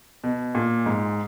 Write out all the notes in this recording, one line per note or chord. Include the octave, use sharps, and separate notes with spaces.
B2
A#2
G#2